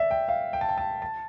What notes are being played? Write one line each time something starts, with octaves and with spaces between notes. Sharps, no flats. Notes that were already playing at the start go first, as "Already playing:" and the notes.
Already playing: D5 E5
G5
F5
G5
A5
G5
A5
A5